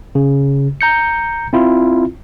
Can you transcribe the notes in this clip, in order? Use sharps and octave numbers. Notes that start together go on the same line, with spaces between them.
C#3
A#5 G6 C#7
C4 E4 F4